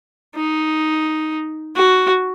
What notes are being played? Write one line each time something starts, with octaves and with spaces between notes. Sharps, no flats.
D#4
F#4